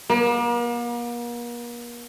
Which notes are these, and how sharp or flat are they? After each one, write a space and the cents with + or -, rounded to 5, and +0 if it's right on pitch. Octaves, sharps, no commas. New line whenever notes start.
A#3 +40